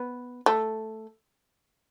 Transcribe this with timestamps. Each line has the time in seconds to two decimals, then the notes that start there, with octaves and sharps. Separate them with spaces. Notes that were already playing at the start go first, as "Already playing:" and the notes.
Already playing: B3
0.46 A3